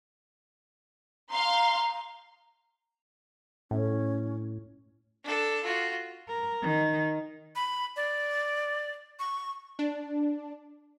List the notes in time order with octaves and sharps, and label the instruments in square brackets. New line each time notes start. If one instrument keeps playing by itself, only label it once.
[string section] F5 C6 [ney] A#5
[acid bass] A2 [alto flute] C#4
[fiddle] D4 A4
F4 F#4
[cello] A#4
D#3
[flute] B5
D5
C#6
[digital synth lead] D4